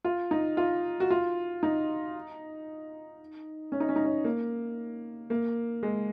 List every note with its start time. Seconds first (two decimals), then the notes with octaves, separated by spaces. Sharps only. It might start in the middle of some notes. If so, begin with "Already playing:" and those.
0.04 F4
0.31 D#4
0.57 F4
1.00 F#4
1.10 F4
1.63 D#4
3.72 C#4
3.80 D#4
3.89 C#4
3.96 D#4
4.04 C#4
4.24 A#3
5.30 A#3
5.83 G#3